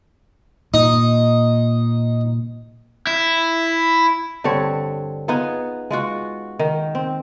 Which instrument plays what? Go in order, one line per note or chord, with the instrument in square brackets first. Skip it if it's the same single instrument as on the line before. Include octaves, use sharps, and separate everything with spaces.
[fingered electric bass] A#2 [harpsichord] D#4
[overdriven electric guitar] E4
[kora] G2 D3 C4 C#5
B3 D#4 F4 G#4
G#3 F4 F#4
D#3
C4